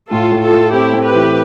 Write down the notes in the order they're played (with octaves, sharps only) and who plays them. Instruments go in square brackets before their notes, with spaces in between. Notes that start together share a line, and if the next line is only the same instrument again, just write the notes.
[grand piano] A2 [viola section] F4 A4
[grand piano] A2
[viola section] F4 A4
[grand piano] A3
[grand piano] C4 [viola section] E4 G4
[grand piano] C4
[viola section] G4 B4
[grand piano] E3